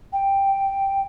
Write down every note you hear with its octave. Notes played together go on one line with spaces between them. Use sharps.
G5